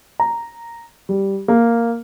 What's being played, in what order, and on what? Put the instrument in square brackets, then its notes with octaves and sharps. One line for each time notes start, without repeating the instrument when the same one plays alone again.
[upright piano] A#5
G3
A#3